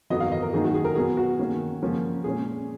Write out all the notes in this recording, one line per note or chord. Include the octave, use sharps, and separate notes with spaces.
F2 D#3 F#3 B3 D#5
F5
D#5
A#4
F#2 D#3 F#3 A#3 D#4 G#4
F#4
G#4
A#4
B2 F#3 B3 G#4
F#4
D#3 A#3 C#4
C#3 F3 A#3 C#4
A#2 G#3 C#4 G#4